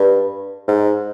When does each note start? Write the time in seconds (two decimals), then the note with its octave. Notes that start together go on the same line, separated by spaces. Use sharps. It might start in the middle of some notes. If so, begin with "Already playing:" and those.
Already playing: G2
0.68 G#2